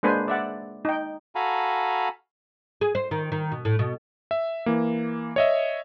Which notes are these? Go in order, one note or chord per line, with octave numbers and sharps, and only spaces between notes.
G#3 A#3 D4 B4 C5 G#5
D5 E5 F#5
D#4 G5
F#4 A4 F5 G#5 A#5 B5
G#4
C5
D#3
D#3
B2
A2
B2
E5
E3 A#3
C#5 D#5 E5